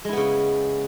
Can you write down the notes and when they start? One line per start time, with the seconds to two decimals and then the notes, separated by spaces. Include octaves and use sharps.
0.05 G#3
0.09 E4
0.13 B3
0.17 C#3